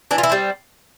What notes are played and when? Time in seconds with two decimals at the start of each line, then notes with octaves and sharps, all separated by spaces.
0.11 E3 D4
0.18 F4
0.23 E4
0.30 G3 C4